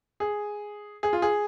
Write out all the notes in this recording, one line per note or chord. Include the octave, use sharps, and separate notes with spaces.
G#4
G#4
F4
G#4